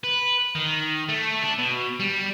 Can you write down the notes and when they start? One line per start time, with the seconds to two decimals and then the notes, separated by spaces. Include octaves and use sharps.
0.04 B4
0.55 D#3
1.09 A3
1.43 D4
1.59 B2
2.00 G3